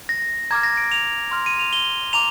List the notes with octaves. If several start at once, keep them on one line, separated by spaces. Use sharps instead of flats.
A#6
A#5 D6 F6 G#6
A#6
D7
F7
C6 F6
D#7
F7
G7
A#5 D6 F7